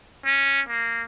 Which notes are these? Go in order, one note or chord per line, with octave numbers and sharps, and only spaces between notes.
C#4
A#3